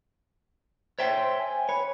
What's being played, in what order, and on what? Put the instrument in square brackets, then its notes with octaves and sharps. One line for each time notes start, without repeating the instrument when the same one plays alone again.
[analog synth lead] C5 [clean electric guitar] C#5 E5 G5
[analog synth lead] G#5
[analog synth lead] B4 [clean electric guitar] C#5